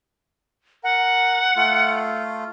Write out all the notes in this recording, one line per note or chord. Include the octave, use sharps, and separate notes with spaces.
A#4 F#5
A3 F4